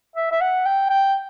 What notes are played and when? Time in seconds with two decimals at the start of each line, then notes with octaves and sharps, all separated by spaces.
0.16 E5
0.32 E5
0.41 F#5
0.66 G5
0.90 G5